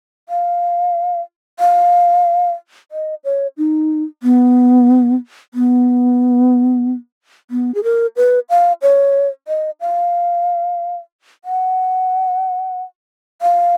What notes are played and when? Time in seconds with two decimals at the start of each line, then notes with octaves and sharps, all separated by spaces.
0.29 F5
1.60 F5
2.92 D#5
3.24 C#5
3.58 D#4
4.23 B3
5.54 B3
7.51 B3
7.75 G#4
7.84 A#4
8.16 B4
8.50 F5
8.82 C#5
9.48 D#5
9.81 F5
11.45 F#5
13.42 F5